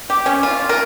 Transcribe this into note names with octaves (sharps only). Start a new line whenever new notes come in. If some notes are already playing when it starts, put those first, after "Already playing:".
G4
C#4
F4
A#4